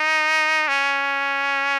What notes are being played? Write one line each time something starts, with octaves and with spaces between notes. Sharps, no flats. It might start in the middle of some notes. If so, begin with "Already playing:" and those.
Already playing: D#4
C#4